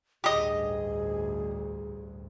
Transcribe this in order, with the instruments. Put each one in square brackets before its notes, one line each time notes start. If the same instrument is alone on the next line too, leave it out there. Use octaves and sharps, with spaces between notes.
[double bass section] A1 D2 G2 [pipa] G4 D#5 [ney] G#4